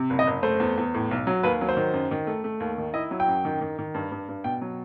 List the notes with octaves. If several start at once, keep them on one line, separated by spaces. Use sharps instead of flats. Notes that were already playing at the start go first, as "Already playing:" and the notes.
Already playing: C3
F#1
D#5
F#1
A3 C5
E2
E2
A2
B1
F#3
D#2 B4
F#3
C5
D#3
F#2
D#3
A3
A3
D#2
D#3
E4 D#5
F#3
G5
F#2
D#3
D#3
D#3
G2
G2
G2
B2 G5
F#3